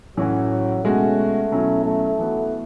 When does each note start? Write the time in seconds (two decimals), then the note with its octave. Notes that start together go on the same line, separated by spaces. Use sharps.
0.17 A2 E3 F#3 A3 C#4 F#4
0.84 B2 G#3 A3 C#4 F#4
1.52 B2 F#3 C#4 E4
1.85 A3
2.19 E3 B3 F#4